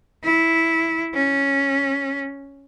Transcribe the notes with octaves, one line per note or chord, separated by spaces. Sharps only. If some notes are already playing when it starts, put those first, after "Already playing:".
E4
C#4